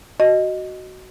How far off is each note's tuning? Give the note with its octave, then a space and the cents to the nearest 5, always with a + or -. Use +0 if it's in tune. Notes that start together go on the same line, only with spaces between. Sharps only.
F#4 +10 D#5 +0